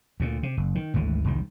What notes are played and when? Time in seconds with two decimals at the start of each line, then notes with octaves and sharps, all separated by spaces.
0.20 D2 A#2
0.43 C3
0.57 F#1
0.75 D#3
0.94 G#1 D2 D3 E3
1.25 E1 C2 D#3 G3